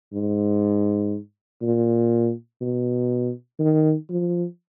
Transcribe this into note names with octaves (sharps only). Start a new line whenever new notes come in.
G#2
A#2
B2
D#3
F3